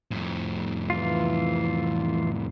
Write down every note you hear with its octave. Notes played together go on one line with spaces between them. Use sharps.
F2 A2
E3 F4